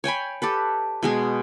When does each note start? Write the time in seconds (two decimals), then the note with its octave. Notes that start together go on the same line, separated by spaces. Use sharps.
0.04 C#5 G5 G#5 B5
0.42 G4 A4 B4
1.03 B2 G#3 G#4